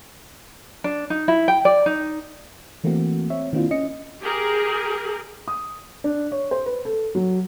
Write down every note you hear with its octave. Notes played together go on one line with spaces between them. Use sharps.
D4
D#4
E4
G5
D5
D#4
E3 A3 A#3 C4 F#4
C4 C#5 E5
D#3 A#3 C4 D4 E4 F4
C#4 D#5 C#7
G4 G#4 A#4
D#6
D4
C#5
C5
B4
A4
F#3